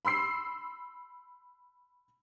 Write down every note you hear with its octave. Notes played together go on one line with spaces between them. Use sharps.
B5 C6 E6 C7